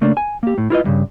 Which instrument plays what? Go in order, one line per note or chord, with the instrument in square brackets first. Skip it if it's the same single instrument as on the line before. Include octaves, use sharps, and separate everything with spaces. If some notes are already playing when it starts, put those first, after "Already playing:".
[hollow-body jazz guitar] C#3 A3 A#3 D4
G#5
A#3 G4
A2
E4 F4 B4 D#5
E2 G2 C#3